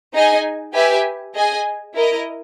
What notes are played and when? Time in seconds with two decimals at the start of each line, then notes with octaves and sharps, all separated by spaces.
0.14 D#4 G#4 D#5 G#5
0.74 G4 B4 E5 G#5
1.34 G#4 D#5 G#5
1.94 E4 A#4 D#5